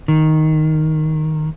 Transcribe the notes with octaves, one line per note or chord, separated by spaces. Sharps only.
D#3